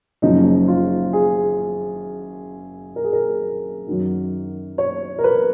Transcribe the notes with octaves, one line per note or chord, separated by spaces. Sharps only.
F#1 F#2 C#3 F3 D#4
F4
G#4
A#4
G#4
A#4
F#2 D#3 F#3
C#5
A#4
B4